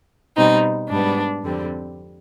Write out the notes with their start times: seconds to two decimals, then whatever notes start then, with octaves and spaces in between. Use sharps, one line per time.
0.36 B2 G3 C4 D#4
0.90 G#2 G3 B3 D4
1.43 F2 D3 G3 C4